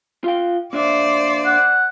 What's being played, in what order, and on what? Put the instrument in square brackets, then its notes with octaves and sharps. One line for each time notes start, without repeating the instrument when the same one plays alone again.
[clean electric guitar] F4 F5 G5
[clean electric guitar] A#3 D4 E5 [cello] C5 D5
[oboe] F#5